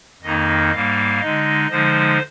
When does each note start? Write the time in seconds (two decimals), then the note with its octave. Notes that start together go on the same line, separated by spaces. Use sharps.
0.22 F2 D#3 A#3 D#4 D#5
0.71 G#2 G3 A#3 F5
1.21 D3 G#3 D#4 D#5
1.70 D3 F3 G#3 D#4 C5